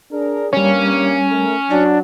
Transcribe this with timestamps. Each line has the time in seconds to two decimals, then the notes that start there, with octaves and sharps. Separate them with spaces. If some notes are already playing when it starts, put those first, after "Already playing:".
0.12 D4 G#4 A#4
0.53 G2 G3 A#3 C#4 C#5
1.28 A3 A#4
1.70 F#3 D4